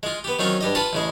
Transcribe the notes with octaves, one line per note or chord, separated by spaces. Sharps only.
G#3 F4
B3 G4
D#3 F#3 C4 C#4 F4
G2 G4 D#5
F4 B4 F#5 A5
A1 C#3 G#3